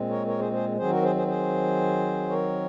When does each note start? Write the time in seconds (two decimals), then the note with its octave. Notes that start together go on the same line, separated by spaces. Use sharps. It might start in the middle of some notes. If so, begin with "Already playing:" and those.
Already playing: A#2 G#3 C4
0.09 A#4 C#5
0.27 A#4 C#5
0.39 G#4 C5
0.52 G#4 C5
0.77 D#3 F#3 C4 G#4 C5
0.90 F#4 A#4
1.03 G#4 C5
1.15 G#4 C5
1.27 G#4 C5
2.28 A#4 C#5